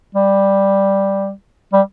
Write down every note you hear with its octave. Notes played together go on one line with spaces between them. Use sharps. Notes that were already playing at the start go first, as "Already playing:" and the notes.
G3
G3